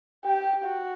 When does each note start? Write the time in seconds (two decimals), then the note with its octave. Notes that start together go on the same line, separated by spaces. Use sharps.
0.24 G4 G5
0.65 F#4